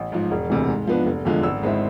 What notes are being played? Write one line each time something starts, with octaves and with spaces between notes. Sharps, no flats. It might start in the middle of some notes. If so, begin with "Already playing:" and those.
Already playing: A1
G#2 F3
E1
D2 C3 E3
G#2
F3 B3 D4
F1
E2 D3 F3 G#3
G#1 E6
G#2 G#3 C4 E4